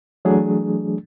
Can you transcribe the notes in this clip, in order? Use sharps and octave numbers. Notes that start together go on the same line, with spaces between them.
E3 F#3 A3 D4 G#4